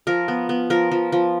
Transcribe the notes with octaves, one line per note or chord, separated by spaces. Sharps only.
F3 A#4
B3
B3
F3 A#4
F3
F3